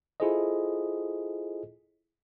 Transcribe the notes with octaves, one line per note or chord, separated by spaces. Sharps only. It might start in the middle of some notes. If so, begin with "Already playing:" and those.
E4 F4 G#4 A4 C5 D#5